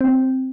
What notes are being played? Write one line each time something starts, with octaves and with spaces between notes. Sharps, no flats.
C4